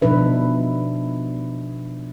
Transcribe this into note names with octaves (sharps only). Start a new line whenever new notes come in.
B2 F3 D4 D#4 B4 E5